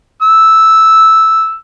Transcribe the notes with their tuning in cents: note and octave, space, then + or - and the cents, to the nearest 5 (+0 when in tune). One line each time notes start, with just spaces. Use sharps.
E6 -5